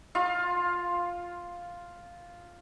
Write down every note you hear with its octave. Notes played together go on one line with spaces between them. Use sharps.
F4 F5